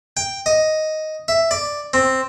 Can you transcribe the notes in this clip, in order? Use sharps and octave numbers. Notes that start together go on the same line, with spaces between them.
G5
D#5
E5
D5
C4